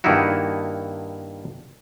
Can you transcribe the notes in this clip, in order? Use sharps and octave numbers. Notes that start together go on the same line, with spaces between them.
G2 D#3 A#3 D#4 E4 F#4